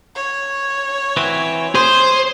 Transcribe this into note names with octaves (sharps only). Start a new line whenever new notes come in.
C#5
E3 C4 F#4
G#4 C5